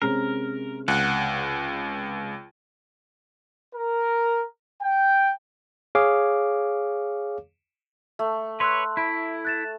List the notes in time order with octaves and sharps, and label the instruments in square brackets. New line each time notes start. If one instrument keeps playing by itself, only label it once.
[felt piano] C3 G#3 C#4 [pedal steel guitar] A#4
[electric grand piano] C#2 [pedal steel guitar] F#5
[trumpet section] A#4
G5
[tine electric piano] G#4 C#5 F5 D6
[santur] A3
[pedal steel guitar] B4 C#5 [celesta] C6 E6 F#6
[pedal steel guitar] E4 [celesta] B5 D7
[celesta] F#6 A6 E7